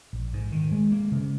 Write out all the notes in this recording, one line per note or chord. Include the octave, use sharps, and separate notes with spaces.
A#1
G#2
D#3
G#3
A#3
C#3